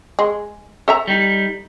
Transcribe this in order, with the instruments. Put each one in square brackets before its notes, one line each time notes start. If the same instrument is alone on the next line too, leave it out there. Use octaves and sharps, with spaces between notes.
[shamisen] G#3
A4 E5 A#5
[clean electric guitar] G3 D#4